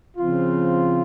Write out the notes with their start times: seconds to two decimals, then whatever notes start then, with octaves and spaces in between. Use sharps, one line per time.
0.16 C#3 F3 C4 F4